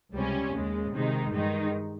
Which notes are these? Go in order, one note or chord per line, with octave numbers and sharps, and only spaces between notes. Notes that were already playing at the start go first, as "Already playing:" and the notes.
C#2 C3 G3 C#4
D#2 C#3 G#3
C3 D#3 G#3 D#4
G2 D#3 G#3 D#4